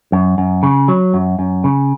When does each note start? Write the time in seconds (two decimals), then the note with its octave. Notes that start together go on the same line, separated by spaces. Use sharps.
0.12 F#2
0.38 F#2
0.63 C#3
0.88 F#3
1.14 F#2
1.39 F#2
1.64 C#3